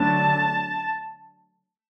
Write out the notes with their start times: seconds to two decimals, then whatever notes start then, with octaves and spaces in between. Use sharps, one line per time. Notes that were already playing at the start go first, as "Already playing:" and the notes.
Already playing: D3 F#3 A3 D4 A5